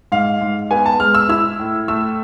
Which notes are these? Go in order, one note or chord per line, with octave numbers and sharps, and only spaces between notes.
G#2 F5
G#2
B3 G#5
A5
G#3 F6
E6
E4 E6
A2
A3 E6